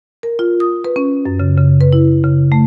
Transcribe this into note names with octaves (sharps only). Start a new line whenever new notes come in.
A#4
F4
D#6
B4
C#4
F#2
C#3
C#3
B4
E4
C#3
A3